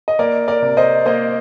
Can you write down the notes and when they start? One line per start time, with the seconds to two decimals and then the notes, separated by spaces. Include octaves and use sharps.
0.08 D#5
0.19 A#3 A#4 D5
0.48 A#4 D5
0.62 C3
0.77 C5 D#5
1.06 A#3 C5 D#5